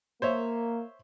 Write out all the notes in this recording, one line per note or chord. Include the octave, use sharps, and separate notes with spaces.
A#3 C5 C#5 E5